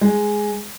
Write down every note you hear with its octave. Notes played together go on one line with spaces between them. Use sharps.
G#3